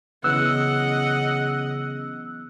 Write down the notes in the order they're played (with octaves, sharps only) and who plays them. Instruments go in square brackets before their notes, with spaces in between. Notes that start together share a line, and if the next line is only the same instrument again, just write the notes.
[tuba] C#3 [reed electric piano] E3 F#3 B3 [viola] D#5 F#5 [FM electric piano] E6 F#6